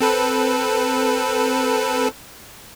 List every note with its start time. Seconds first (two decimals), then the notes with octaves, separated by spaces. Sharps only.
0.01 C4 A4 B4